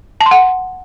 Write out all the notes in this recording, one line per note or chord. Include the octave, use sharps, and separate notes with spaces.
A5
C6
F#5